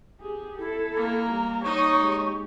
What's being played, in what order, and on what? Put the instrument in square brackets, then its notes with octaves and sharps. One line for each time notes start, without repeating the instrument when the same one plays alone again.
[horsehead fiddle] G4 G#4
[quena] E4 [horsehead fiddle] A4
[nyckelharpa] A#3 [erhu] A#5
[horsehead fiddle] G3
[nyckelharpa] D#4 D#5 [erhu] C#5 [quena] C#6
[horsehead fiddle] G#3 G4